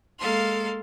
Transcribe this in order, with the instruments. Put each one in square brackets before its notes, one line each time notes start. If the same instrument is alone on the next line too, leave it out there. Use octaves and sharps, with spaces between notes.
[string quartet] G#3 A#3 A4 F5 C6